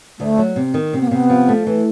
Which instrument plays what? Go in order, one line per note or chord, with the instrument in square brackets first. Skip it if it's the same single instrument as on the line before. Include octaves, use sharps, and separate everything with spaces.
[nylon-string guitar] D2 [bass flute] A3
[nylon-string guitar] F#3
C3
D#3
[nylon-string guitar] C3 [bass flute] C4
[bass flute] B3
A#3
[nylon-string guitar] C3 [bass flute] B3
[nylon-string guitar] F3
A3
E3